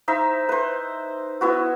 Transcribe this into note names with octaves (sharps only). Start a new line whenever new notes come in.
D#4 C5 E5
B4 C5
B3 E4 F#4